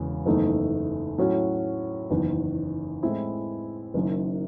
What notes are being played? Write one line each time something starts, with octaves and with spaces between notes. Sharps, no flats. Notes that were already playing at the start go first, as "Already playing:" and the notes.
Already playing: E1 E2 C#3
F#1 E2 D#3 A3 D#4
A2 F#3 C#4 F#4
F#1 E2 D#3
A2 G#3 C4 E4
F#1 F#2 D#3